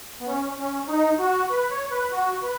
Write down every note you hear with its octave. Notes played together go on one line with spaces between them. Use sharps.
B3
C#4
C#4
D#4
F#4
B4
C#5
B4
F#4
B4